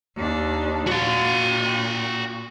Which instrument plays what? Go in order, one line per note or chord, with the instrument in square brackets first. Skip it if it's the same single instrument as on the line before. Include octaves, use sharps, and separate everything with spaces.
[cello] D#2 D4
[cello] A#2 [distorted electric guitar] F#4 F5